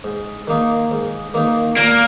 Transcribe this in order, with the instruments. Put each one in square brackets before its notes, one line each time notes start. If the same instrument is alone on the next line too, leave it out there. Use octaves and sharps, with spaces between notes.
[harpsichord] G#2
D#3 A#3 D#4
G#2
D#3 A#3 D#4
[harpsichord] A#2 [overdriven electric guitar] A#3